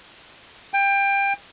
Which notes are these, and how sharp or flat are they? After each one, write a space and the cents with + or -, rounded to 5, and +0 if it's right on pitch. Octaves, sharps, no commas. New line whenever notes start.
G5 +25